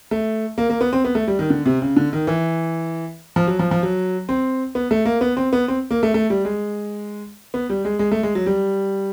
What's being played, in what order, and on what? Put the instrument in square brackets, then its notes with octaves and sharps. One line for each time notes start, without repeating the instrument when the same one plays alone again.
[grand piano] A3
A#3
A#3
B3
C4
B3
A3
G3
D#3
D3
C3
C#3
D3
D#3
E3
F3
F#3
F3
F3
F#3
C4
B3
A3
A#3
B3
C4
B3
C4
A#3
A3
A3
G3
G#3
B3
G3
G#3
G#3
A3
G#3
F#3
G3